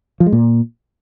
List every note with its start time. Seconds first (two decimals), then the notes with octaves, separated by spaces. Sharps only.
0.20 F3
0.26 G#3
0.32 A#2